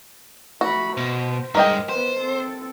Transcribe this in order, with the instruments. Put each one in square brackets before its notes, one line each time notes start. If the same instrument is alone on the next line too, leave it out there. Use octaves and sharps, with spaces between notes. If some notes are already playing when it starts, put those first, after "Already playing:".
[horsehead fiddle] A3 B5 [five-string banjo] F#4
[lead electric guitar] B2 [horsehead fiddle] C5
[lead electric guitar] G2 G#3 [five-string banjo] A#4 D#5 G5
[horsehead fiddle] B3 B4 [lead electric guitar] C5
[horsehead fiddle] C4 A4